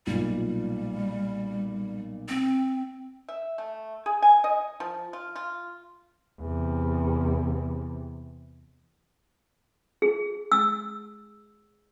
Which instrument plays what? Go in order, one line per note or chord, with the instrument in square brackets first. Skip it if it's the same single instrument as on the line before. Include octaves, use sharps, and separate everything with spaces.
[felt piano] B1 A#2 [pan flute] G3
[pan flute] C4
[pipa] E5
A3
G#4
G#5
D#5
F3
F4
F4
[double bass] E2 C3
[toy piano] G#4
E6